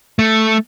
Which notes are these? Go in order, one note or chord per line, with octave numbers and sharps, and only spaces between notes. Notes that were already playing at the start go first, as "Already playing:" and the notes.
A3